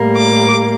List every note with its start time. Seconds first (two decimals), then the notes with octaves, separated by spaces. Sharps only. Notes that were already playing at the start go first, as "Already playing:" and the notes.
Already playing: A2 G3 A#3
0.16 D6